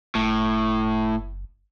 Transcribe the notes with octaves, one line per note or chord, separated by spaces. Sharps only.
F#1 A2